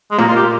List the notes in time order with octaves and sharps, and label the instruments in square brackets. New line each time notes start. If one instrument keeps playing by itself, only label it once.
[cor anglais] G#3
[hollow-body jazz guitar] A#2 [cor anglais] A#3
[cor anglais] F4
G4